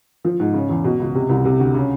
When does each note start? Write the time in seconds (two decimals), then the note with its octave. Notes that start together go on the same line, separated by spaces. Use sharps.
0.24 F3
0.40 G#2
0.54 C#3
0.69 E2
0.84 B2
0.99 C#2
1.15 C3
1.29 C2
1.45 C3
1.59 D2
1.74 C#3